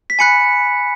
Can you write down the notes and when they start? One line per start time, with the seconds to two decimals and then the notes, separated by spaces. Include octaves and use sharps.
0.10 B6
0.19 G#5 B5 F#6 C#7